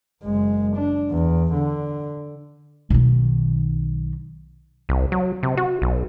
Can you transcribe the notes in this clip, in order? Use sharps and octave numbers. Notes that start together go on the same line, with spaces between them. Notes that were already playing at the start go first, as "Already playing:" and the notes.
F#1 G#3
D4
E2
D3
B1 D#3
C2
F#3
C3
F#4
B1